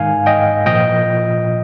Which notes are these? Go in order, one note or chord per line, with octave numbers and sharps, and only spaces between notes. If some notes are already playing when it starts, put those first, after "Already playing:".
Already playing: G#2 D#3 F5 G#5
D#5 G5
A#2 F3 D#5 G5